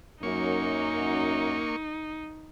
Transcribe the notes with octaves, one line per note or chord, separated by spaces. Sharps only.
F#2 A#3 D#4 C#6